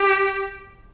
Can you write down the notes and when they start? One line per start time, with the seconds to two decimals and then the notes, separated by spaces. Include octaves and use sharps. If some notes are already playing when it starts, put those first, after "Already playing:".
Already playing: G4